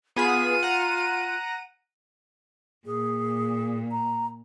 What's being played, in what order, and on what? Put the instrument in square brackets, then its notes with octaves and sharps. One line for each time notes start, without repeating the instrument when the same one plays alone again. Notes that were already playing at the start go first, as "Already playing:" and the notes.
[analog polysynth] B3 G#4 B6 [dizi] F4 [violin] D#7
[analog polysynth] F#5 A#5
[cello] A#2 [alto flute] G#4
[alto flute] A#5